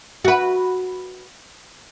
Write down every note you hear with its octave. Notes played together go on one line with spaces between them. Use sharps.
F#4 B4